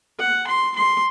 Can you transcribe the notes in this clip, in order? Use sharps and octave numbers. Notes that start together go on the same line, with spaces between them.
F#5
C6
C6